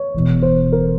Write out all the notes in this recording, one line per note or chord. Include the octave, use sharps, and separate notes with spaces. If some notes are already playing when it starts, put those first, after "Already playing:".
Already playing: C#5
E1 E2 B2
C5
A#4